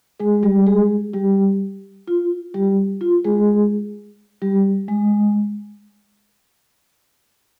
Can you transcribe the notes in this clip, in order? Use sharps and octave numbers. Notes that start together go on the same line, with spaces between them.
G#3 G#4
G3 G4
G#3 G#4
G3 G4
F4
G3 G4
F4
G#3 G#4
G3 G4
G#3